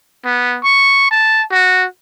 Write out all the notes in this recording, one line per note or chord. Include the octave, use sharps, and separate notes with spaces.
B3
C#6
A5
F#4